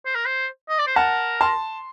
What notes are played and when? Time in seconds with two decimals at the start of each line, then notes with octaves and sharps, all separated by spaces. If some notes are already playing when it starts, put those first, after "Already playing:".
0.05 C5
0.15 A#4
0.26 C5
0.69 D#5
0.78 D5
0.87 C5
0.96 A#4 F#5 A5
1.41 A5 C6